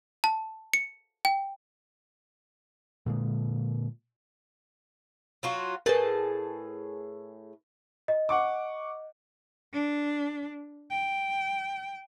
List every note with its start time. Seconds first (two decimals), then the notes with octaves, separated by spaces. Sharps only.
0.24 A5
0.73 C#7
1.25 G5
3.06 A#2 D3 G#3
5.43 F#3 F4 F#4
5.86 A2 G#4 A#4 B4 A5
8.08 D#5
8.29 F#5 C#6 D6
9.73 D4
10.91 G5